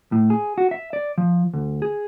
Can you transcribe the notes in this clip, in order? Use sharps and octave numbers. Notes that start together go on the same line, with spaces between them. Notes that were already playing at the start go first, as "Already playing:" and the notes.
A2
G#4
F#4
E5
D5
F3
D2
G#4